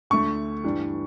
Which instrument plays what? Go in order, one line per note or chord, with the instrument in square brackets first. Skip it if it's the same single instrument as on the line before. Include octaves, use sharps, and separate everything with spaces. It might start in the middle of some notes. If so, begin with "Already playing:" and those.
[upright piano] D2 D3 A3 C#6
G2 E3 G3 D4